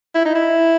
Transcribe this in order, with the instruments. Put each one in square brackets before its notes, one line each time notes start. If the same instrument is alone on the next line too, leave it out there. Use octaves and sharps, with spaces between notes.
[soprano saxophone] E4
D#4
E4